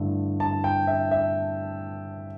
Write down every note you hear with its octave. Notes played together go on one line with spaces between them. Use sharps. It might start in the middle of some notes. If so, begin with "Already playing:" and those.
Already playing: G2 D3 A3 E4
A5
G5
E5
E5